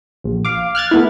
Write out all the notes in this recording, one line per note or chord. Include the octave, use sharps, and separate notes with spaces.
A#1
F5 D6
F6 F#6 G#6 A6
A3 B3 E4